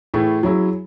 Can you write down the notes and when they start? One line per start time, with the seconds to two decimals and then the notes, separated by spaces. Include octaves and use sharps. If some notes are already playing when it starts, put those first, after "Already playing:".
0.14 A2 E3 A3 E4 G#4
0.43 F#3 C#4 E4 G#4